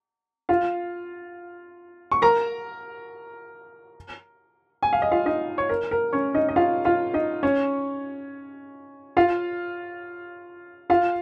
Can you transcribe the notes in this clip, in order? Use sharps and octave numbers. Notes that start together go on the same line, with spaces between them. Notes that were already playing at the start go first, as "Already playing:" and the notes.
F4 F5
C#6
A#4 A#5
G#5
F5
D#5
F4 F5
D#4 D#5
C#5
A#4
A#4
C#4 C#5
D#4 D#5
D#5
F4 F5
F4 F5
D#4 D#5
C#4 C#5
F4 F5
F4 F5